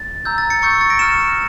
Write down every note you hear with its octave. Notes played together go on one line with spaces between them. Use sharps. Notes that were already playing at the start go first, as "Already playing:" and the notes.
Already playing: A6
A#5 E6 G6
A6
A6 C#7
C#6 E6 G6 A6 C#7
A6 C#7
A#6 D7
C#6 F6 C#7 E7